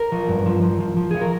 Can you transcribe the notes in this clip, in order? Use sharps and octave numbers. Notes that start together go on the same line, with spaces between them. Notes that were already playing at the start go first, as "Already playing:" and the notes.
Already playing: A#4
F3
G2
F3
F3
F3
F3
F3 G#4
A#4